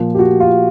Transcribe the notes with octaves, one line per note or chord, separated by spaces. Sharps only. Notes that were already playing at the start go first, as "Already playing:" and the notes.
Already playing: A#2 F3
G4
F#4
F4